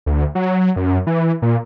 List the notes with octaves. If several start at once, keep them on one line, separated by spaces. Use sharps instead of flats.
D2
F#3
F#2
E3
A#2